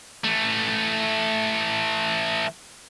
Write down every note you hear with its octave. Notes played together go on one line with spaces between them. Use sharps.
E3 A3